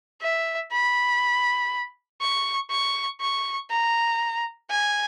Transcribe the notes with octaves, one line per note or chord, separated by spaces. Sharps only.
E5
B5
C#6
C#6
C#6
A#5
G#5